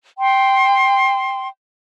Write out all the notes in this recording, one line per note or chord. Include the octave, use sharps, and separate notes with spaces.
G5 C6